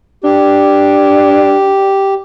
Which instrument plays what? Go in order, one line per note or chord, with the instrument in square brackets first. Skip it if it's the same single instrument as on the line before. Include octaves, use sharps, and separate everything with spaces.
[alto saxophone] D4 [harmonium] G4